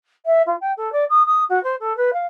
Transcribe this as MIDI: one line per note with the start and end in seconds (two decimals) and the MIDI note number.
0.26 0.42 76
0.47 0.56 65
0.61 0.72 79
0.77 0.90 69
0.92 1.05 74
1.10 1.23 87
1.26 1.44 87
1.49 1.62 66
1.64 1.76 72
1.80 1.96 69
1.97 2.11 71
2.13 2.26 77